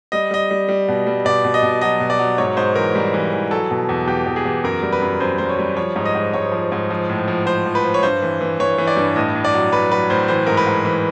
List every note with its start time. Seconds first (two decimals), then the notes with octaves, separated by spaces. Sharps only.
0.12 G3 D#5
0.31 G3 D#5
0.51 G3
0.69 G3
0.88 B2
1.07 G3
1.25 B2 D5
1.45 B2
1.54 D#5
1.63 B2
1.81 F#3 D#5
2.00 B2
2.10 D5
2.19 F#3
2.38 G#2 C#5
2.57 G#2 C5
2.75 E3 A#4
2.95 G3
3.14 E3
3.33 E3
3.51 F#3 A4
3.71 B2
3.89 E2
4.07 E2 G4
4.26 E2
4.36 G#4
4.45 E2
4.64 F#2 A#4
4.82 G3
4.92 B4
5.02 F#2
5.20 F#2 C5
5.38 G3 C5
5.49 C#5
5.59 G3
5.77 F3 C#5
5.96 G#2
6.06 D#5
6.15 G#2
6.33 G#2 C#5
6.52 F3
6.72 G#2
6.90 F3
7.09 A2
7.28 F3
7.46 F3 C5
7.66 F3
7.75 B4
7.84 F3
7.94 C#5
8.03 G2 C5
8.22 E3
8.41 E3
8.60 E3 C#5
8.78 E3
8.87 D5
8.97 G2
9.16 A2 D#5
9.35 A2
9.45 D5
9.53 F#3
9.73 F#3 B4
9.91 F#3 B4
10.10 A2 C5
10.28 E3 C5
10.46 G#2 A#4
10.57 B4
10.67 G#2
10.85 E3